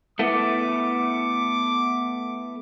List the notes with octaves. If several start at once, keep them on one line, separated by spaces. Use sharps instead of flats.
A3 B3 E4 D6